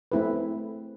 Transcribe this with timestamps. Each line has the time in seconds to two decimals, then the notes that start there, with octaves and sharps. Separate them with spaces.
0.12 A3 C4 E4 G#4 B4